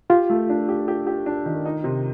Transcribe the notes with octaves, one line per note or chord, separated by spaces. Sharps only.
F4 G4
A3
D4
G4
G4
G4
D4
D#3
D#4
C3